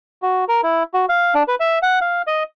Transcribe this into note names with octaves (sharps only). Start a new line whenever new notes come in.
F#4
A#4
E4
F#4
F5
D4
B4
E5
F#5
F5
D#5